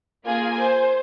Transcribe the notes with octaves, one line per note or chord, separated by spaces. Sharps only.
A#3 F4 G#4 G#5
C5